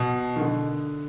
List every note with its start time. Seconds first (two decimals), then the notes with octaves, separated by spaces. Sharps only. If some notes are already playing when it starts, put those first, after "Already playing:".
Already playing: B2
0.36 D#3
0.41 D3